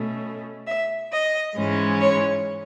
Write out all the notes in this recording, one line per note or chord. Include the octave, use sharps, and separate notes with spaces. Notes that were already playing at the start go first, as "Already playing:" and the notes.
Already playing: B2 A3 C#4
E5
D#5
G#2 E3 G#3 C#4
C#5